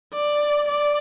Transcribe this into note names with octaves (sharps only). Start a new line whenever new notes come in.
D5
D5